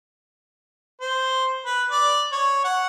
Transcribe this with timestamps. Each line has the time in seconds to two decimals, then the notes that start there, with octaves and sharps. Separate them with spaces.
1.01 C5
1.66 B4
1.91 D5
2.32 C#5
2.64 F#5